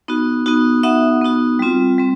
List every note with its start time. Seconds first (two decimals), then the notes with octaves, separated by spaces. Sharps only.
0.08 B3 D#4 F#4
0.46 B3 D#4 F#4
0.83 B3 D#4 F#4 E5 F#5
1.21 B3 D#4 F#4
1.59 G3 C4 F4
1.98 G3 C4